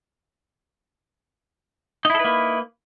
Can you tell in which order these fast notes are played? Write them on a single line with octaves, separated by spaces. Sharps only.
D#4 E4 A4 B4 A#3